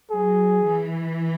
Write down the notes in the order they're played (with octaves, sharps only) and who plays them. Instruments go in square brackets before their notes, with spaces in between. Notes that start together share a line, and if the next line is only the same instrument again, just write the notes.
[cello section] F#3 [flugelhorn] G#4
[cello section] E3